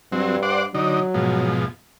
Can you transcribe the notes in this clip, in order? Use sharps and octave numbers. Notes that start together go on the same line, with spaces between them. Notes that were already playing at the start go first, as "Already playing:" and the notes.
G2 F#3 C4
C5 D5 F#5
D3 F#3 D#4
G#2 B2 F3